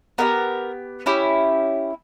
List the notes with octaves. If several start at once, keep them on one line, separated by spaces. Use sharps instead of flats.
B3 E4 G4 A#4
C#4 E4 G4